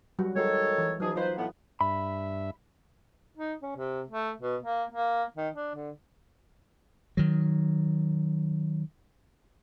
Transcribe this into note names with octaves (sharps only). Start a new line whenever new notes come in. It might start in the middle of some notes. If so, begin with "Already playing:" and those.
F#3 G3 F#4
D#3 G#3 F#4 A4 C#5
E3
C#2 F3 F#3 D#4 G#4
D#4 F4 B4 C5
A2 B3
G2 E5 B5
D#4
C#4
C3
A3
B2
A#3
A#3
D#3
D4
D3
D#3 F#3